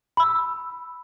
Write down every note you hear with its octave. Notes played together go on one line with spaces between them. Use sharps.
B5 E6